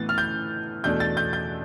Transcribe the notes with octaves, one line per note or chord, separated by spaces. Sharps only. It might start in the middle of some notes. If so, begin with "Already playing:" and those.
Already playing: A2 E3 B3 A6
F6
G6
E2 B2 A3 D4 G6
A6
G6
G6